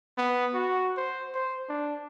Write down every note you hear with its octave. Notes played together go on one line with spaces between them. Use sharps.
B3
F#4
C5
C5
D4